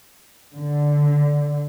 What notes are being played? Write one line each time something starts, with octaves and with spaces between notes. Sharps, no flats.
D3